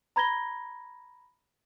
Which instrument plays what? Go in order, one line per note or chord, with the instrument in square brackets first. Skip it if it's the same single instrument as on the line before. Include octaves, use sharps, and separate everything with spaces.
[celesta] A#5 B5 G#6 A#6 G7